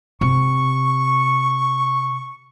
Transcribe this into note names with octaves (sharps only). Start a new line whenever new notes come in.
C3 C#6